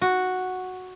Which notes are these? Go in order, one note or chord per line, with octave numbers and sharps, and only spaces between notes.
F#4